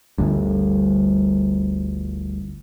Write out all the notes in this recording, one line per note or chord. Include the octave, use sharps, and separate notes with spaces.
G1 D2 G2